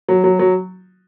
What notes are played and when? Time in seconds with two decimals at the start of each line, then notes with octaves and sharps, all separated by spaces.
0.09 F#3
0.24 F#3
0.39 F#3